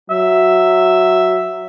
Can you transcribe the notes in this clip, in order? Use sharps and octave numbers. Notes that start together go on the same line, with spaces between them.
F#3 E5